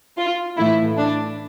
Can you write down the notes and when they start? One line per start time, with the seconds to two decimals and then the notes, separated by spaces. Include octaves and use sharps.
0.17 F4
0.57 A2 E3 A3 E4
0.97 D4